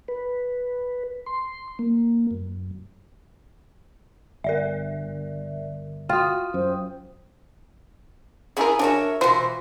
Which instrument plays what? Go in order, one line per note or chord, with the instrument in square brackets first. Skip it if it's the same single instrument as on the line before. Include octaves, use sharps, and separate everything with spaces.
[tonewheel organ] B4
C6
A#3
F#2
[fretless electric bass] G1 [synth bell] A#4 D5 E5
[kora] F4 [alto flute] F#4 [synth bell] G5 D#6
[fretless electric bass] F#2 [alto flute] C5
[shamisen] C#4 E4 A#4 [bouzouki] G#4 B4 G#5
[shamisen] D4 F#4 [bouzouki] A#4 C#5 E5
[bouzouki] B2 E3 [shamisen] F4 F#4 C5